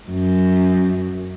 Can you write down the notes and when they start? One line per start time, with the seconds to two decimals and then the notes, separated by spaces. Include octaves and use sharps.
0.10 F#2